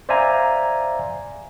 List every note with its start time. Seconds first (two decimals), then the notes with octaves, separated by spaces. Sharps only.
0.09 C5 D5 E5 F5 G#5 A#5